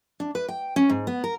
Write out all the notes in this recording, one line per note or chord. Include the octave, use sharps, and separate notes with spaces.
D4
B4
G5
C#4
G#2
B3
A#4